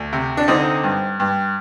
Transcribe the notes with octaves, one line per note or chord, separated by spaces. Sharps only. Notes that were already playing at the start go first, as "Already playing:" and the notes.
Already playing: D2
C3
D4
D3 C4 D#4
G2
G2